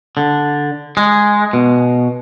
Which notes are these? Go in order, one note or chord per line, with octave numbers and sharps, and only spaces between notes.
D3
G#3
B2